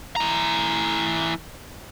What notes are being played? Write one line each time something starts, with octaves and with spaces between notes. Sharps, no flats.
E3 A#5